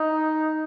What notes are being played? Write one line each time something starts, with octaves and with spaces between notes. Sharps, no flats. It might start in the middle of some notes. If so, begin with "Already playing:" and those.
Already playing: D#4